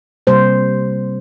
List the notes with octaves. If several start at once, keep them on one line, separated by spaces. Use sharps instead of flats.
C3 G3 A#3 C5